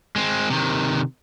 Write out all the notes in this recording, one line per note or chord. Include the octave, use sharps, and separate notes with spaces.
G#3 C4
C3 D#3